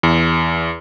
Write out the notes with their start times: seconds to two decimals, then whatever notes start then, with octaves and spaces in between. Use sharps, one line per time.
0.03 E2